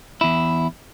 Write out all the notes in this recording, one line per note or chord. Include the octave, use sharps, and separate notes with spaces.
E2 E4